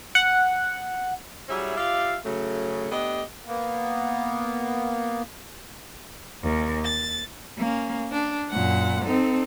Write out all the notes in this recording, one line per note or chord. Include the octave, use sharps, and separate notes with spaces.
F#5
F#3 G3 C#4 E4 G#4 E5
F4 G4 D5 E5 F5
C#3 F#3 A3
A3 B3 D4 G4 D#5
A#3 B3
D#2
A6
A#3 C#4
D4
F#2 A#2 F#5
C4 D#4 A4